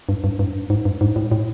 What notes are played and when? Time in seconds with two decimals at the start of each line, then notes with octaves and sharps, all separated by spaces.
0.09 G2
0.24 G2
0.39 G2
0.70 G#2
0.85 G2
1.01 G#2
1.16 A2
1.32 A2